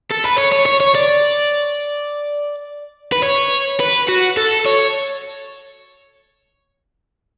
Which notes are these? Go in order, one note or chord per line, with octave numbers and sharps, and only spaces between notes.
A4
B4
C#5
C#5
C#5
C#5
D5
B4
C#5
B4
F#4
A4
C#5